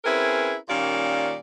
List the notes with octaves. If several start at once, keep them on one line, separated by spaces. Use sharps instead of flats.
C4 C#4 E4 G#4 A#4 B4
A#2 D#3 G3 A#3 C#4 D5